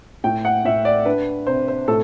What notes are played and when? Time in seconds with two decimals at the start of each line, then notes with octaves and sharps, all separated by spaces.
0.24 A2 G5
0.45 F#5
0.65 A2 E5
0.85 D5
1.06 D4 B4
1.47 C3 C5
1.68 C5
1.88 A2 A4